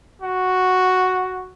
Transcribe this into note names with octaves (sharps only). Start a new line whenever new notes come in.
F#4